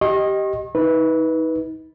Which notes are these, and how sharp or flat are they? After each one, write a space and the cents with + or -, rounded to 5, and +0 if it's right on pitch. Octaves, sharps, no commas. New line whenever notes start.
G4 -10 D#5 +0 C#6 -45
D#4 +35 B4 -10